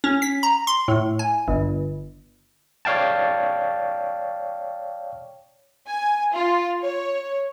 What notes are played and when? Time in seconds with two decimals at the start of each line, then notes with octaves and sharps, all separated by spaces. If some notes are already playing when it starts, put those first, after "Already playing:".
0.04 C#4
0.22 B6
0.43 A#5
0.67 C6
0.88 A2
1.19 G#5
1.48 G1
2.85 C#5 D5 F5 G5 A5
5.87 G#5
6.32 F4
6.82 C#5